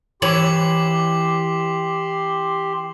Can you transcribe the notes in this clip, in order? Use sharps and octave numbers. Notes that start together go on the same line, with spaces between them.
E3 G4 C#5 C6 D6 F#7